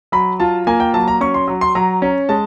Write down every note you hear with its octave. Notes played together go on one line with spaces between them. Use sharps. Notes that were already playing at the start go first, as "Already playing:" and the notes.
F#3 B5
F4 A5
A#3 G#5
G5
F#3 A5
A#5
C#4 C#6
C6
F#3
C6
F#3 A#5
C#4
G#3 A5